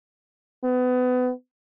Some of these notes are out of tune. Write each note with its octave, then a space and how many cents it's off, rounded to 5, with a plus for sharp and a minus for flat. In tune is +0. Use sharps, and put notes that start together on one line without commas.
B3 +30